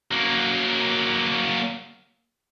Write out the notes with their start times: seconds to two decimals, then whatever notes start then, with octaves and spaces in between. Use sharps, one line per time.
0.11 F#3 A#3